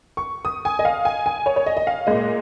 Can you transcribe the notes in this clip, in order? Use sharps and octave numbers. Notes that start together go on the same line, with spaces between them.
C#6
D#6
G#5
D#5
F5
G#5
G#5
C#5
C#5
D#5
D#5
F5
A#2 G#3 D#5